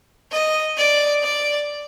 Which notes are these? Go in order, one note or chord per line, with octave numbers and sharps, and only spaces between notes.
D#5
D5
D5